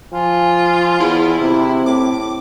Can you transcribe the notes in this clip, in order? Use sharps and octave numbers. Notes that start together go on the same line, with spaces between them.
F3 F4 G#5
E2 E4 G#4
C3 C4
A2 D6